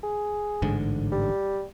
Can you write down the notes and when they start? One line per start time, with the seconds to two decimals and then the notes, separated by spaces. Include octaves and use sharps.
0.03 G#4
0.62 A1 G#2 D3
1.12 G3